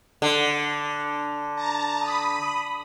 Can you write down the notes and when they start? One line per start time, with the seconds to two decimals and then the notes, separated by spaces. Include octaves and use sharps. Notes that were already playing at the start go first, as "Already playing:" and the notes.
0.22 D3
1.55 A5 A#5
2.00 B5 D#6